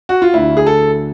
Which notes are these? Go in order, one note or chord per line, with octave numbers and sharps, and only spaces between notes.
F#4
F4
D2 D3 E4
G#4
A4